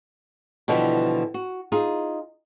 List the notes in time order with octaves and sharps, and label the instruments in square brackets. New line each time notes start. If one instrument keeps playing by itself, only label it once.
[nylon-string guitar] B2 D3 E3 F3 G3
F#4
D#4 F4 G#4